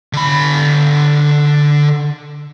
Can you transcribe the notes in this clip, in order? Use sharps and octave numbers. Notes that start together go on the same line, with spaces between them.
D3 B5